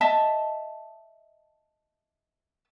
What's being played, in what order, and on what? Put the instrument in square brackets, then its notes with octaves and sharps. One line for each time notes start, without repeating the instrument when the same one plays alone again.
[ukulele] D#5 E5 A5